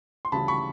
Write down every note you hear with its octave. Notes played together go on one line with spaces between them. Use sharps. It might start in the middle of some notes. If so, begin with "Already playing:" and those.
C6
D2 C#3 E3 G3 A5 B5
B5 C#6